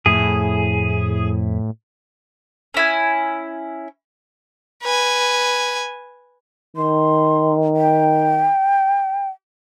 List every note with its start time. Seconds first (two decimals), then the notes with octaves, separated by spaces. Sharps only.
0.06 F2 A2 E4 G#4
2.74 C#4 E4 G#5
4.83 B4 G#5
6.77 D#3 C6
7.76 G5